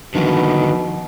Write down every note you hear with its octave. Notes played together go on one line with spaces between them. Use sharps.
B2 D3 D#3 F3